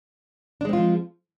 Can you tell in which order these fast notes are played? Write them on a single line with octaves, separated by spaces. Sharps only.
D4 G#3 C4 F4 F3